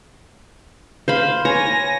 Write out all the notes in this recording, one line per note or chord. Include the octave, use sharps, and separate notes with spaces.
C5 F5 B5
C#5 G#5 A#6